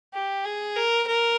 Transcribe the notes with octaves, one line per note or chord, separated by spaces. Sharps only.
G4
G#4
A#4
A#4